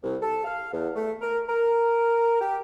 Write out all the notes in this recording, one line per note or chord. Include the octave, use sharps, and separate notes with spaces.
C2
A4
F5
E2
A3
A#4
A#4
G4